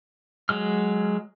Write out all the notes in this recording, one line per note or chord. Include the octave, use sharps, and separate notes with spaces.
F#3 G#3 F6